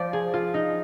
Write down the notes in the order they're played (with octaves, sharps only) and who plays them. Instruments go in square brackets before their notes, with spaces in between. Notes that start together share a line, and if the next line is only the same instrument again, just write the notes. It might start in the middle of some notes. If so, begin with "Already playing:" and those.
Already playing: [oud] F3 [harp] D5
[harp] G#4
F4
D#4